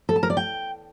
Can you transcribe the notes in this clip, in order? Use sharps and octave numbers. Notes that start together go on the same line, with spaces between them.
A4
A5
A#4
D5
G5